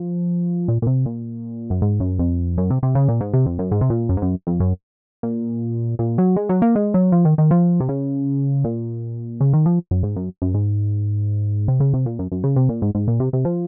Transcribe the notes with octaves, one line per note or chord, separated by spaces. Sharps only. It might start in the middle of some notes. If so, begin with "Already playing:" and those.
Already playing: F3
A#2
A#2
C3
A#2
F#2
G#2
F#2
F2
F#2
C3
C3
C#3
A#2
G#2
C3
F2
F#2
G#2
C3
A#2
F#2
G#2
F#2
F2
F#2
A#2
A#2
F#3
G#3
F#3
A#3
G#3
F#3
F3
D#3
D#3
F3
C3
C#3
A#2
C#3
D#3
F3
F#2
G#2
F#2
F#2
G#2
C3
C#3
C3
A#2
F#2
F#2
C#3
C3
A#2
G#2
G#2
A#2
C3
C3
F3